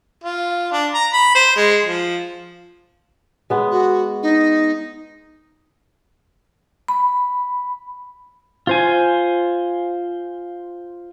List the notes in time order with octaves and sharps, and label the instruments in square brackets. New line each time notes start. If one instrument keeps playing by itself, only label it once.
[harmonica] F4
D4
A#5
B5
C5
G#3
F3
[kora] G#3 B3
[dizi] F#4
D#4
[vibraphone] B5
[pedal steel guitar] F4 C5 G#5